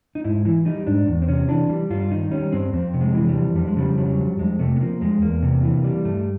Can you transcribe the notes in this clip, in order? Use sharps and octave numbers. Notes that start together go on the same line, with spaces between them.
D#4
G#2 E4
E3 E4
G3 D#4
G#2 D4
E2
C4
C3 C#4
E3 D4
G3
G2 F4
D#3 D#4
G3 C#4
G2 C4
F2 C4
C3
G#3
E3
G3
F2
F2 G3
G#3
C#3 G3
F#3
F2
F2 G#3
C3 A3
B3
F3 A#3
F2 G#3
E2 A#3
C3
E3
G3
G2 A3